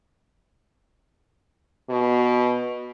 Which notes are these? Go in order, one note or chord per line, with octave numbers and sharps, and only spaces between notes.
B2